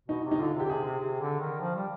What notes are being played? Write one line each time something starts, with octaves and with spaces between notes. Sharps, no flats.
B2 D#4
C3
D#4
D3 F4
C3
G4
D3
C3 G#4
C3
C3
D3
D#3
F3
G3